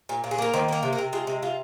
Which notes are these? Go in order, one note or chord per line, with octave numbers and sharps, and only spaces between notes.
A#2
A#2
G#4
A#3 A#4
D#3 C5
A#3 A#4
C3
A#4
C3
G#3 F4
C3
C3 F4